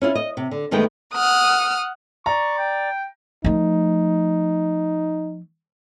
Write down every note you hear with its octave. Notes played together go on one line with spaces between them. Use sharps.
C#4 E4 F4
D#5
C3
D3
F#2 D#3 G#3 A3 B3 G5
F#5 D#6 F6
D5 A#5 C#6
G5
F3 A3 D#4